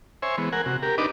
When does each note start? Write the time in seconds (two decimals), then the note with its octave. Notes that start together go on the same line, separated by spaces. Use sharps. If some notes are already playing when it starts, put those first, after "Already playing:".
0.22 C5 C#5 E5 G#5
0.38 E3 G#3 B3
0.53 A#4 F#5 G#5
0.66 C3 F#4
0.83 G4 A#4
0.98 D4 D#4 B4 D#5 D6